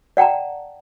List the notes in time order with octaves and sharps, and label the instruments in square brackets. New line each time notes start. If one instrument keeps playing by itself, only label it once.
[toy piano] D5 F#5 G5 A5 A#5